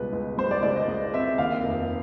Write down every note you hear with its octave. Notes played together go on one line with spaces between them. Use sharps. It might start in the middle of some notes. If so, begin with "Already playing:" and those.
Already playing: C#2 B2 G3 B4
C#2
G3 C5
D5
C#2 D5
D#5
C#2 D#5
C4 E5
D#2 F5
F1